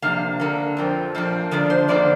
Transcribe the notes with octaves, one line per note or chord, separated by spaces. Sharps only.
C3 F3 A#3 D4 F5
D3 A#3 D4
F2 F3 C4
A#2 F3 A#3 D4
D3 F3 A#3 D4 D5
C5
F2 D3 A#3 D4 D5